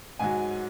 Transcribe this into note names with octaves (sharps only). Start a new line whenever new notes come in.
G#2 F#3 G#5